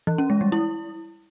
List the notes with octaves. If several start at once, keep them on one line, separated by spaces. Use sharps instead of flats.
E3
C#4
G#3
G3
E4